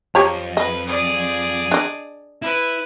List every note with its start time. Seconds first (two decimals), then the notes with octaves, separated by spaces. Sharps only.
0.15 F2 G4 C#5 A#5
0.57 B4 D#5
0.87 G#4 D5
1.71 D4 D#5
2.42 E4 B4